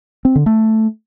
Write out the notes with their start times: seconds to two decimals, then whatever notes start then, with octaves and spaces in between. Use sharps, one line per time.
0.25 C4
0.36 D3
0.46 A3